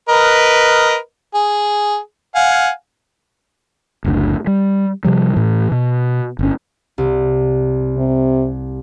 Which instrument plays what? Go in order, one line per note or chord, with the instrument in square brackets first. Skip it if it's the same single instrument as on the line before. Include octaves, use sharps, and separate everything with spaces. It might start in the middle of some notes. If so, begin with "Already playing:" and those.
[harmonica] A#4 B4 D#5
G#4
F5 F#5 G#5
[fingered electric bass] F#1 D2 D3
G3
C3 F3 G3
A2 E3
B2
G1 C#4
[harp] C2
[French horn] C3